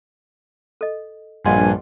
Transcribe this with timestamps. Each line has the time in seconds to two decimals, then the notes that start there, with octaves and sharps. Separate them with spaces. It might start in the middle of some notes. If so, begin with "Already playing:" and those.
0.81 A4 D#5
1.45 A#1 G2 D#5 F#5 G#5 C6